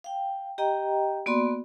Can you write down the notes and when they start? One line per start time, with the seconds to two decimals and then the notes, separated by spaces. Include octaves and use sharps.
0.04 F5 G5
0.58 G4 D#5 G5 A#5
1.26 A#3 B3 F#4 D5 B5 C6